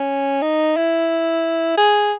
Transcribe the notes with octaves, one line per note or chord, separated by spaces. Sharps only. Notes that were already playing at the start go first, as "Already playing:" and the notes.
Already playing: C#4
D#4
E4
G#4